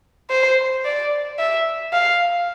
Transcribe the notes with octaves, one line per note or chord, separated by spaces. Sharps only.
C5
D5
E5
F5